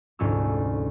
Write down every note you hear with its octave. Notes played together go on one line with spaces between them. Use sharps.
F1 D2 G#2 C#4 F4 E6